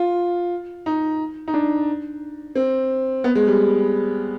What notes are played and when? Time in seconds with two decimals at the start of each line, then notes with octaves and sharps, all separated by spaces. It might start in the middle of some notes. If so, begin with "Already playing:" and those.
Already playing: F4
0.86 D#4
1.48 D#4
1.54 D4
2.55 C4
3.24 B3
3.35 G#3
3.47 G3